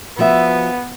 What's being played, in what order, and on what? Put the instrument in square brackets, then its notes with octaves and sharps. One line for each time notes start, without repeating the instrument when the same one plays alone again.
[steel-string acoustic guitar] F3 F#4 E5 [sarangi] B3